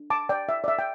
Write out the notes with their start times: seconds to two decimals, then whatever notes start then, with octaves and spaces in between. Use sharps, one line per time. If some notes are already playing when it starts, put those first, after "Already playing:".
Already playing: D4
0.10 A5 D6
0.29 D5 G5
0.49 E5
0.64 D5
0.68 E5
0.79 G5